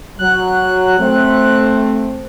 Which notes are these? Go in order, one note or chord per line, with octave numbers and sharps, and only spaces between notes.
F#3 F#6
A3 C4